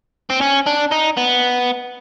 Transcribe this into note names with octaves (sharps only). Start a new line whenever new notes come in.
C4
C#4
D4
D#4
B3